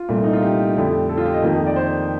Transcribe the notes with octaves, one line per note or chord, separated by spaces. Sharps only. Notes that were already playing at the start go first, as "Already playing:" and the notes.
Already playing: F4
C2 A#2 A3
D#4
F4
G4
F2 D3 A3
A4
F4
G4
D#5
F2 D#3 A#3
D5
C5